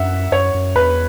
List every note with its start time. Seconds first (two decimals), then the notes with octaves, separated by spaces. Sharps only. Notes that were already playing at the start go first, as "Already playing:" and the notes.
Already playing: F#2 E5 F#5
0.32 F#2 C#5
0.54 F#2
0.76 E2 B4